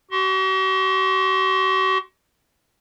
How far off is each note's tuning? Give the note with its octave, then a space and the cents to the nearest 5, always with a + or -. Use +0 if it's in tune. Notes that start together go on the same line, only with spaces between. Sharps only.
F#4 +45 C6 +25